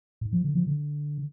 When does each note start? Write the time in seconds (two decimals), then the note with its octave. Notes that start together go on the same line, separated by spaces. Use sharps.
0.21 G#2
0.33 F3
0.44 D3
0.55 F3
0.67 D3